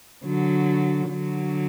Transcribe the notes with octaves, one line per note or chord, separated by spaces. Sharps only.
D3 F#3
D3 F#3